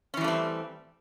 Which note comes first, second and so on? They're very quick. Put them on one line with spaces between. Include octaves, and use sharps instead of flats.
C#4 E3 G3 A3 C4